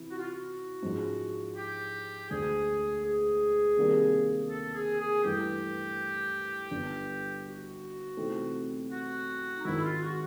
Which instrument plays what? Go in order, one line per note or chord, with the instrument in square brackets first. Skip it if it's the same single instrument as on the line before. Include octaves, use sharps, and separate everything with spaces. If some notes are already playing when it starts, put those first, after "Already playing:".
Already playing: [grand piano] C3 E3 E4
[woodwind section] F#4
F4
F#4
[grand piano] G#2 F3 G#3 C#4
[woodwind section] G4
[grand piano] E1 D2 D3 [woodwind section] G#4
[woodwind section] G#4
[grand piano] C3 D#3 G3 A#3 D4
[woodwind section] A4
G#4
G#4
[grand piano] G2 E3 A3 [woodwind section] G4
[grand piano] G1 G2 D3
[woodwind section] F#4
[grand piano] C3 E3 A3 C4 D#4
[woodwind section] F#4
D#4
[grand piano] G#1 G#2 D#3 G#3 [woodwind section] E4
[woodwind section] F4
F#4